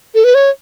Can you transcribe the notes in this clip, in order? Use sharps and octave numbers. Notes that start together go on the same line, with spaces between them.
A4
B4
C#5